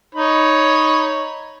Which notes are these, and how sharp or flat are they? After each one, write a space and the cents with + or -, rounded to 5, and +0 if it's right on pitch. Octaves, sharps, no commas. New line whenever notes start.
D#4 +0 C#5 +0 B5 +0